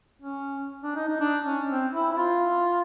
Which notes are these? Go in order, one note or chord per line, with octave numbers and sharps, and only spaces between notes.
C#4
D4
D#4
D#4
D4
C#4
C4
E4
E4
F4